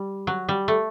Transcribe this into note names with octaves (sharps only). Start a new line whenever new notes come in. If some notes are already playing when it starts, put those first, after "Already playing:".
Already playing: G3
F#3
G3
A3